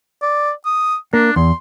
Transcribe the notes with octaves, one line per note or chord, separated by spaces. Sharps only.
D5
D#6
A#3 D4
E2 C6